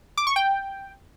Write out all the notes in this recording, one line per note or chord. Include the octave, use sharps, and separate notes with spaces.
D6
C#6
G5